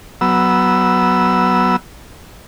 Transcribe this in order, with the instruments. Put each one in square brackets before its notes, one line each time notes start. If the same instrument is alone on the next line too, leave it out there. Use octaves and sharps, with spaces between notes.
[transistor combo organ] F#3 B3 E6